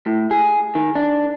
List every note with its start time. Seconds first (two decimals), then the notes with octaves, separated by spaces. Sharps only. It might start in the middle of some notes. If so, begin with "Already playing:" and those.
0.06 A2
0.31 G#4
0.75 D#3
0.95 D4